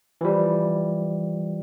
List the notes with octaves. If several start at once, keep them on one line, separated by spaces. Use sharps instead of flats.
E3 F3 G3